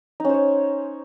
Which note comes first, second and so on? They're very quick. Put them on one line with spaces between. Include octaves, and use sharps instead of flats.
D#4 C#4 C5 C#5